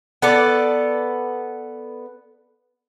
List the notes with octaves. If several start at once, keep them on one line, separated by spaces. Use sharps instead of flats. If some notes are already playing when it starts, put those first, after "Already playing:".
B3 A4 D5